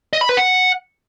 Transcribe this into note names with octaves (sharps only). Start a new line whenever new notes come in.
D#5
B5
B4
F#5